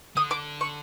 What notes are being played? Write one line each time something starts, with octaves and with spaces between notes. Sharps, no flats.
D3 D#6
D6
C#6